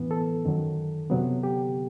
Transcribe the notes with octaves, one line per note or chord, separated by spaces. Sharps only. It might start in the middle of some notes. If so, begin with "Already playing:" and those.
Already playing: A2 E3 B3 B4
A4
F#2 D#3 F#3
C3 F#3 B3
G4